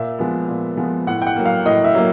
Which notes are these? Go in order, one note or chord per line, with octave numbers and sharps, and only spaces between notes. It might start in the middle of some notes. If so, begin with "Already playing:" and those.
Already playing: A#2 E5
F3 G#3 B3
A#2
F3 G#3 B3
A2 F#5
G5
F#5
F#3 A#3
F5
A2 D#5
E5
F#3 A#3